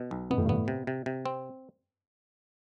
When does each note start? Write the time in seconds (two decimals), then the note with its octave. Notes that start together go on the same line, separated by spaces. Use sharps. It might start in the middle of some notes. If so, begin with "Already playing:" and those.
Already playing: B2
0.11 B1
0.30 B2 B3
0.38 A2
0.45 G2
0.49 A2 B3
0.68 C3
0.87 C3
1.06 C3
1.26 C4